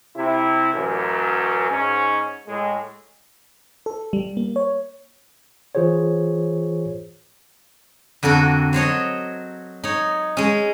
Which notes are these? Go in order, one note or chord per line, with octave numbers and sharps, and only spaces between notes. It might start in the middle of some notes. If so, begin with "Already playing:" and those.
C3 E4
A1 F#2
G#2 C#4
A2 G#3
A4
G3
A#3
C#5
E3 F4 G#4 C5 C#5
F2 D3 F#4 A4 A#4
F#3 C5 C#5 D#5
D#4 C#5
G#3 C#4